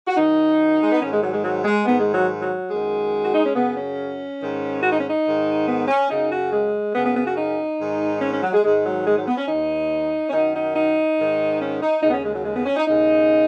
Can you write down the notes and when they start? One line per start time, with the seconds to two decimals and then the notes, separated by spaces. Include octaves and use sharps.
0.07 F#4
0.16 F#2 D#3 D#4
0.81 G#3
0.91 B3
1.01 G#2 D#3 C#4
1.12 G#3
1.22 F#3
1.33 G#3
1.43 F#3
1.64 G#3
1.86 G#2 D#3 B3
2.00 G#3
2.14 F#3
2.41 F#3
2.70 F#2 D#3 G#3
3.24 F#4
3.34 D#4
3.44 C#4
3.55 F#2 C#3 B3
3.76 C#4
4.40 G#2 D#3
4.82 F#4
4.91 D#4
4.99 C#4
5.09 D#4
5.25 G#2 D#3
5.67 B3
5.88 C#4
6.09 F#2 C#3 D#4
6.31 F#4
6.51 G#3
6.94 F#2 C#3 B3
7.05 B3
7.15 B3
7.26 F#4
7.36 D#4
7.79 G#2 D#3
8.21 C#4
8.32 C#4
8.42 F#3
8.53 G#3
8.63 G#2 D#3 G#3
8.85 F#3
9.06 G#3
9.16 F#3
9.27 B3
9.38 C#4
9.48 D#2 D#3 D#4
10.29 C#4
10.33 F#2 D#3 D#4
10.54 D#4
10.75 D#4
11.18 G#2 D#3
11.60 C#4
11.81 D#4
12.02 D#2 C#3 D#4
12.09 B3
12.13 C#4
12.23 G#3
12.34 F#3
12.45 G#3
12.56 B3
12.66 C#4
12.77 D#4
12.87 D#2 C#3 D#4